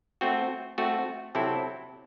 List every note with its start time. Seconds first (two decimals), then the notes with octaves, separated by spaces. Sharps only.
0.21 A3 C4 F#4
0.78 A3 C4 F#4
1.35 C3 F#3 C4 E4 A4